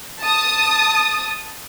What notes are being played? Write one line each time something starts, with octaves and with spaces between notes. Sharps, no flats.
A5 D#6